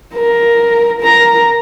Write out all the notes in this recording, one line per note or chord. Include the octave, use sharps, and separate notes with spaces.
A#4
A#4 A#5